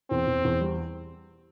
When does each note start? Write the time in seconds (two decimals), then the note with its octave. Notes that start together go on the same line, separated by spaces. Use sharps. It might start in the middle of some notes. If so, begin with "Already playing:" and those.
0.10 E2 C4
0.27 E2
0.45 E2
0.61 G3